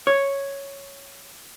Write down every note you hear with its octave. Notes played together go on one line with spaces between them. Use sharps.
C#5